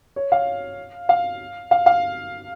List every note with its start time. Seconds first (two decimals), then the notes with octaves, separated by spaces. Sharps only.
0.16 C#5
0.32 F5
1.09 F5
1.71 F5
1.86 F5